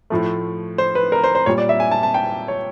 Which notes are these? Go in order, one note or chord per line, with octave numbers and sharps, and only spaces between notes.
A2 F3 A3
C5
B4
A#4
C5
C5
A#2 G3 C#5
D5
E5
G#5
A5
A5
G5
C#5